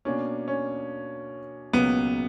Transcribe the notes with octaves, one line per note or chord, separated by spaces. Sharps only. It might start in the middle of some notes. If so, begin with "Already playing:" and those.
B2 A#3 C#4 D4
C#4
C#2 B2 F#3 A#3 B3 C#4